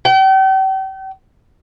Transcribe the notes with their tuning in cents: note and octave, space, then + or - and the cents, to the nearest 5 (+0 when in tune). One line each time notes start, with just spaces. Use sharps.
G5 -40